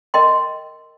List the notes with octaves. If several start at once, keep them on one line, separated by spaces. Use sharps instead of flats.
A#4 D#5 G5 C6